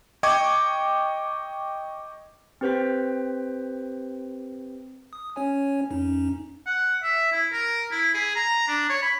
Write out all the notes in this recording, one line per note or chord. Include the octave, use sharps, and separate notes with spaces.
D#5 G5 C#6 D6 G#6
C4 G4 B4 C5 G5 B6
D#6
C#4 C#5 G#5
F2 C#4 D#4
F#5
E5
E4
A#4
E4
G#4
A#5
D4
C#5
B5